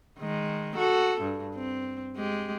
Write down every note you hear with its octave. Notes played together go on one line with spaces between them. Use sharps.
D#3 G#3
F#4 A4
G2
C4
G#3 G4